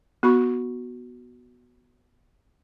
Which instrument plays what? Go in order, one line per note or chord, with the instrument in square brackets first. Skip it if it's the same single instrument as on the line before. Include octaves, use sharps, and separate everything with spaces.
[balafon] B3 F#4 B5 C#6